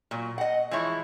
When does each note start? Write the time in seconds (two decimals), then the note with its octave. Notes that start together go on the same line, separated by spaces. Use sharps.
0.11 A#2 F#3
0.38 D#5 F#5
0.71 E3 F3 G#3 E4 C#5